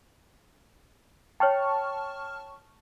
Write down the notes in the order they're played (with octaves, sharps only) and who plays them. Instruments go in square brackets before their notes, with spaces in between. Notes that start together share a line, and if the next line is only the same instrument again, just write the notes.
[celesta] C#5 G5 [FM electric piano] A5 C#6 F6